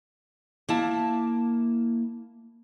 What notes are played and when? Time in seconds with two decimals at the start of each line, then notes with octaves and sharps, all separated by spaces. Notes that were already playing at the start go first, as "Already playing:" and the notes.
0.69 A#3 E4 A5